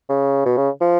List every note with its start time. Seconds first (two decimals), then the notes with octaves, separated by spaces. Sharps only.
0.10 C#3
0.46 B2
0.57 C#3
0.81 F3